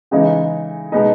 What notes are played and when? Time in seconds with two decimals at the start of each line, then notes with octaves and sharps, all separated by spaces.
0.11 C#3 E3 G#3 D#4
0.92 B2 G#3 B3 D#4